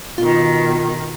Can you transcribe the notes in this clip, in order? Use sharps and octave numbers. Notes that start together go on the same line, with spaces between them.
B2 D#3 F4